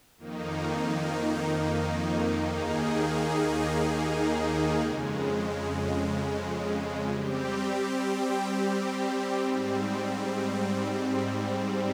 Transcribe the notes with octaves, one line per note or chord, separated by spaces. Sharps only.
F2 D#3 A#3 D#4
D#2 D#3 A#3 D#4 G#4
F2 C#3 G#3
G3 C4 G4
G#2 G3 C4